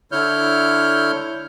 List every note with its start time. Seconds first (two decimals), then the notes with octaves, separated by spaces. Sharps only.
0.12 D3 E4 C#5 F6 G6